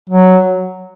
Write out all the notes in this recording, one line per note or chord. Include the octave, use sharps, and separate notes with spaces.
F#3